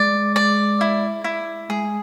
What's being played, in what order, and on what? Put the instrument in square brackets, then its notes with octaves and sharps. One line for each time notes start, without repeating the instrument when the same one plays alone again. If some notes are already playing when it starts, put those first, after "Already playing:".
Already playing: [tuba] G#3 [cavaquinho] D5
[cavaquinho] D5
E4
E4
[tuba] G#3 [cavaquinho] G#4